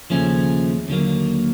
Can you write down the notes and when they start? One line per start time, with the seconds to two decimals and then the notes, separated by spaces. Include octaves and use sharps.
0.10 D#2 C#3 F3 A3 C#4
0.88 D#2 D3 F#3 A#3